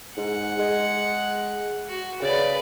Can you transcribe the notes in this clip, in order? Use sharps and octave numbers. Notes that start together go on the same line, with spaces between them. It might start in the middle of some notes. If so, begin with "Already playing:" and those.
G#2 F#5
G#3
F#4
C#3 B4 D5